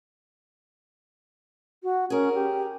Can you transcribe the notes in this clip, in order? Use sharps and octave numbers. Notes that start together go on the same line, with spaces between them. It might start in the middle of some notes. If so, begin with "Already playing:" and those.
F#4
C#4 G#4 A#4
G4